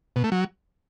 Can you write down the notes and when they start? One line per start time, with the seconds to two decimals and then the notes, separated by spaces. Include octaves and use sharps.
0.16 B2
0.24 A3
0.32 F#3